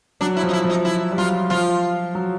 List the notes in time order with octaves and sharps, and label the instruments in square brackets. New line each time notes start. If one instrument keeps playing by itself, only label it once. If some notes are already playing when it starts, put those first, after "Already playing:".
[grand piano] F#3 [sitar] D4
[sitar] E4
[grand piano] F3
[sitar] D#4
E4
[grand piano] F3
[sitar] D#4
E4
[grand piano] G3
[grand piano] F#3 [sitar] F4
[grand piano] F3 [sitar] F4
[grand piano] F#3